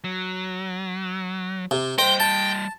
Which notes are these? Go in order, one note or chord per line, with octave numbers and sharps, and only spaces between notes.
F#3
C3
G3 C5 D#5 G5
A5